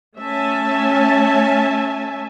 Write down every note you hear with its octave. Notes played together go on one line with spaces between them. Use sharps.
A3 C#4 E5 G#5 A5